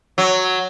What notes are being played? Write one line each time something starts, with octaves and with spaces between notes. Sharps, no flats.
F#3